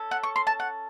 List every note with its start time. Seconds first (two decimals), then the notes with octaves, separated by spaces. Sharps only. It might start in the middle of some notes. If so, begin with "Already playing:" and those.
Already playing: C#4 A4
0.11 F#5
0.23 C#6
0.36 C6
0.47 A5
0.60 F#5